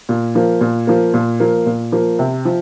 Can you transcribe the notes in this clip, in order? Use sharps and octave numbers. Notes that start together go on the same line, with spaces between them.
A#2
F3 A#3
A#2
F3 A#3
A#2
F3 A#3
A#2
F3 A#3
C3
F3